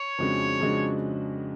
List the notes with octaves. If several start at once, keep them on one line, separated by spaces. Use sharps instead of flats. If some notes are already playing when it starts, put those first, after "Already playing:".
Already playing: C#5
F2 C#3 G#3 D4 F#4
F2 C#3 G#3 D4 F#4